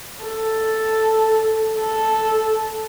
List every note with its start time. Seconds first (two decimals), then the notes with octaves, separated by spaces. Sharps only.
0.24 A4
1.79 A4